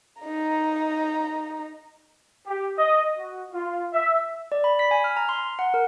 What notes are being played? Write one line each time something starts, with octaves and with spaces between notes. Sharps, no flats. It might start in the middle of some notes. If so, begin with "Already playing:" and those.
D#4 A#5
G4
D#5
F#4
F4
E5
D5
B5
B6
G#5
F6
A#5
C6
F#5
A#4